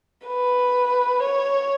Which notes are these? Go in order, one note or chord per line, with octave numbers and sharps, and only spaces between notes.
B4
C#5